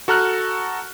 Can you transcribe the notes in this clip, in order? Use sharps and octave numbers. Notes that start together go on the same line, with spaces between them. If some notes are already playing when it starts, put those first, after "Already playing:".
F#4 A4 A#5 F6 F#6